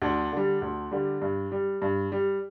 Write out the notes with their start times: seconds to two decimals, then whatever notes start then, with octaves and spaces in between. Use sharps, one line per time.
0.02 D2 D4
0.32 D3 G3
0.62 D2
0.92 D3 G3
1.22 G2
1.52 G3
1.82 G2
2.12 G3